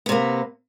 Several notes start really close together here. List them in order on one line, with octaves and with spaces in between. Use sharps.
B3 C3 A#3